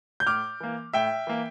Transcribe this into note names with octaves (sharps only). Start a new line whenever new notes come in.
G6
A2 D6 F6
E3 A#3
A2 E5 G5
E3 A#3